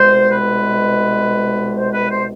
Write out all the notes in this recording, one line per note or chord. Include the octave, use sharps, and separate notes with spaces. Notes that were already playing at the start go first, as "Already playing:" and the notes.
Already playing: C2 B2 G#3 C5
B4
C5
B4
C5